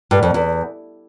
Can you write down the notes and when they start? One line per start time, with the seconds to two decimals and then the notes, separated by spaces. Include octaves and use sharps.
0.11 G2
0.23 F2
0.34 E2